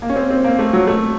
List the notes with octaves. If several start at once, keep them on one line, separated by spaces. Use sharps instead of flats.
A#3
C#4
C4
C4
A#3
A3
F#3
A3